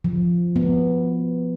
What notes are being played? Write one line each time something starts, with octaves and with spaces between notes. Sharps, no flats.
F3
B3